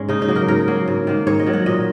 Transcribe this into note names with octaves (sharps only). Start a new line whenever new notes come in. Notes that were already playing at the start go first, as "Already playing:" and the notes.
Already playing: G#2 G#3 A#3 C#4
C#3 D#4
D#4
F#3 A#3
A#4
G#2 A#4
F#3 A#3
G#2
D#3 A#3
G#2 C#5
D#5
D#3 F#3
F#5
A#2 D#5